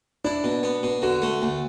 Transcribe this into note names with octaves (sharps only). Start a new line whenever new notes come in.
D4 E4
B2
B3
B2
D3 F#4
A3
D2